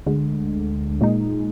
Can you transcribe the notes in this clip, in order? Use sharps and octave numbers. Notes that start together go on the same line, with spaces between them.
D2 D3 G#3
A#2 G#3 D#4